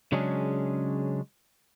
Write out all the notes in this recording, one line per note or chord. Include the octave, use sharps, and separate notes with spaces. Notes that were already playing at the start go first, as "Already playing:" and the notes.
C#3 F#3 G#3 C#4 D4 G#4